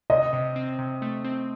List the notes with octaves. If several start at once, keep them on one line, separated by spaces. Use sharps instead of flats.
C3 D#5
C3
C4
C3
A3
C4